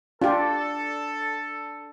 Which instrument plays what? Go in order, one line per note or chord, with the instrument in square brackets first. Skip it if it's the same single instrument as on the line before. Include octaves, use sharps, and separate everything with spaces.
[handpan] D4 [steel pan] F4 G4 [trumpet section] A4